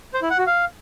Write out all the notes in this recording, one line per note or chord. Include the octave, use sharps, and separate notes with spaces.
C5
E4
F#5
F#4
F5